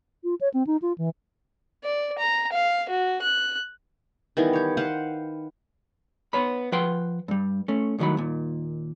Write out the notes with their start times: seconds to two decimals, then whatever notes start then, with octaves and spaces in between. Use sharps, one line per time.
0.24 F4
0.41 C#5
0.54 C4
0.67 D#4
0.82 F4
0.98 E3
1.84 D5
2.18 A#5
2.52 F5
2.89 F#4
3.22 F#6
4.37 D#3 E3 G3 B3
4.53 G4 C#5
4.77 B4 C5 F5 F#5
6.33 B3 C#5 B5
6.72 F3 B4 F#5 G5 C6
7.28 G2 G3
7.68 A3 C#4
7.99 C2 A2 D#3 F#3 F#4 B5
8.17 D#2 A#2